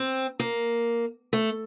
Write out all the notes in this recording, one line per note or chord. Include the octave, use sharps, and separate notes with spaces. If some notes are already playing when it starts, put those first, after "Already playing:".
Already playing: C4
A#3
A3